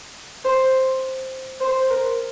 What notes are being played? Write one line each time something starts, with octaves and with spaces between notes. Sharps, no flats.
C5
C5
A#4